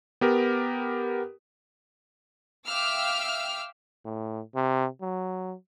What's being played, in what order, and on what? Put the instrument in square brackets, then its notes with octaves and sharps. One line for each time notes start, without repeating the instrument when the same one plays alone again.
[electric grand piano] B3 G4 A#4
[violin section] E5 F5 G5 D6 E6 F6
[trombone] A2
C3
F#3